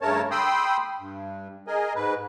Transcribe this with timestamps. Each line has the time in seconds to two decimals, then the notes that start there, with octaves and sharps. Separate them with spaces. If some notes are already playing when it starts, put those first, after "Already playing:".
0.02 G2 C#3 A3 A#4 C#5 A5
0.31 G5 B5 C6 D#6 E6
1.00 G2
1.67 G#4 A#4 D#5 G#5
1.95 G#2 B4